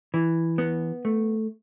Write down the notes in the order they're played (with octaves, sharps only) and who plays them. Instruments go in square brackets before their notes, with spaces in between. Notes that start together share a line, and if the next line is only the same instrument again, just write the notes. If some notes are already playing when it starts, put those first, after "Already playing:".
[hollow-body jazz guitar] E3
B3
A3